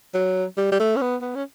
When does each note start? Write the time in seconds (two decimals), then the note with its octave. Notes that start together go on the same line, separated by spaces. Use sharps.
0.14 F#3
0.57 G3
0.72 G3
0.80 A3
0.96 C#4
1.01 B3
1.22 B3
1.35 C#4